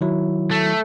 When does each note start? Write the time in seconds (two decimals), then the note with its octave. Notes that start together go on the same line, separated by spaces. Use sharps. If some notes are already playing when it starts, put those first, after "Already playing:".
0.01 D#3 F#3 E4
0.51 A3